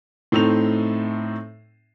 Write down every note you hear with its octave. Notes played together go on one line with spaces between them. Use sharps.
A2 A3 C4 D#4 F7